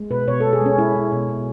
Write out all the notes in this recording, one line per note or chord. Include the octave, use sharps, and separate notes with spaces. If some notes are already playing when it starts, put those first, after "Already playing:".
Already playing: G#3
B2 B4
B2 C#5
A4
G#3
G#4
G#3 C#4
G#3 E4
G#3
B2
B2